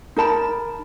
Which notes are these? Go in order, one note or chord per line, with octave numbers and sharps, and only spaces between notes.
D#4 A#4 A5 B5